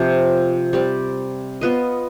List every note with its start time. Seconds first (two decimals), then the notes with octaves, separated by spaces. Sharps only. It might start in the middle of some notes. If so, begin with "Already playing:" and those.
Already playing: C3 F3 C4 F4
0.73 G3 C4 G4 D5
1.61 B3 F4 B4 D#5